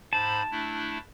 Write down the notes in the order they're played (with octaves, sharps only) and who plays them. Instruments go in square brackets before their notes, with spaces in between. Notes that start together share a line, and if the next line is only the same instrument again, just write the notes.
[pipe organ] G#2 C5 B5 [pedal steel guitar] A5
[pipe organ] A3 D4 E4